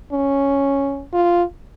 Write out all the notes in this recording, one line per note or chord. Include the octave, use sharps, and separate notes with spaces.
C#4
F4